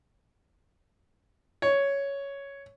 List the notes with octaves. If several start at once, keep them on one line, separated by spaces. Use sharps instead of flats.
C#5